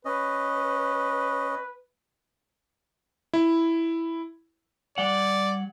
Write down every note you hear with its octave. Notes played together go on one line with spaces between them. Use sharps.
C#4 B4 D#5
E4
G3 D5 F#5